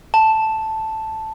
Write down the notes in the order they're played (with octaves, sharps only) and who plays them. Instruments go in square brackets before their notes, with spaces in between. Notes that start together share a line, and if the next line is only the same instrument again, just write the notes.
[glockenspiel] A5